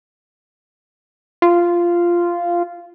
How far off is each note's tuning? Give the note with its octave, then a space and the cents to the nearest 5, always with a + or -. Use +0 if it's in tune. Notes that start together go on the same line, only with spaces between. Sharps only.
F4 -10